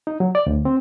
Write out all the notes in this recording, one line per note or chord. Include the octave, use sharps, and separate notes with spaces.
D#4
F#3
D5
D2
C4